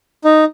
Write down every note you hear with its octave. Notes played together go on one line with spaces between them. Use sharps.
D#4